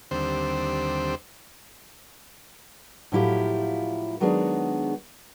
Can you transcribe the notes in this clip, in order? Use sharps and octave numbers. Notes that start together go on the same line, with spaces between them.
D#2 D3 G3 C4 C5
A2 F3 F#3 E4 F4 G4
D#3 F#3 G#3 B3 D4 G#4